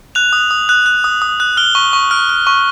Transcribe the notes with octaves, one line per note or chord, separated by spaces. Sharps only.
F#6 F7
D#6
D#6
F#6
F#6
D#6
D#6
F#6
F6 G7
C#6
C#6
F6
F6
C#6